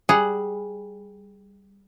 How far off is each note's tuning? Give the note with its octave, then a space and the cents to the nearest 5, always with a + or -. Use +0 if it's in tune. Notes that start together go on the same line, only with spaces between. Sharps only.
G3 +0 G#4 +0 F#5 +0